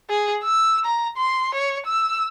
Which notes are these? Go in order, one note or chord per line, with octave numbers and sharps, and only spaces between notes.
G#4
E6
A#5
C6
C#5
E6